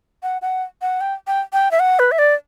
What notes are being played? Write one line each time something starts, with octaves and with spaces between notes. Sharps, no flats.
F#5
F#5
F#5
G5
G5
G5
E5
F#5
B4
E5
D5